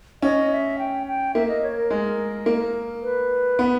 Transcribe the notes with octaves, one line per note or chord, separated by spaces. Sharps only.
C#4 D#5
E5
G5
G5
A#3 E5
D#5
C#5
A#4
G#3
A#3
B4
B3